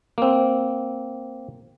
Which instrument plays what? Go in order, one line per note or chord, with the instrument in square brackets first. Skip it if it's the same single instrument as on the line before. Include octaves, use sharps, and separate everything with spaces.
[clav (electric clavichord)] A#3 C4